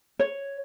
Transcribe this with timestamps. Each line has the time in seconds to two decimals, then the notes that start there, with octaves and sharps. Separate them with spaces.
0.19 C#5